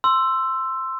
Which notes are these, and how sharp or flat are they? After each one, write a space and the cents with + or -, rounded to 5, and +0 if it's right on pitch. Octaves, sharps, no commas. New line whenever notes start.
C6 +0 E6 +15